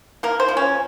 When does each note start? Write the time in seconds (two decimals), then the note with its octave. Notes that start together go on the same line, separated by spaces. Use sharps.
0.23 A#3 A#4
0.40 C5
0.49 F3
0.57 C#4